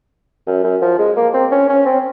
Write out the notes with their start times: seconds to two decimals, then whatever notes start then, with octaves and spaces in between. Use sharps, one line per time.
0.47 F#2
0.64 F#2
0.82 F3
0.99 G#3
1.17 A#3
1.34 C4
1.52 C#4
1.69 C#4
1.86 C4